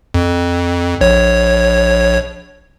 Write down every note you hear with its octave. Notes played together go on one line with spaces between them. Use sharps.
F2
A#1 C#5